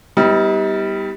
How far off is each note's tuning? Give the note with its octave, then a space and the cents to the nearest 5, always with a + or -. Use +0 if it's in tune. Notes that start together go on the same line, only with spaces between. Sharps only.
G3 +0 B3 +0 D#4 +40